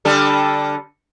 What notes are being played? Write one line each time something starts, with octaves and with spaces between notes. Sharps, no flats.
D3 G3 A4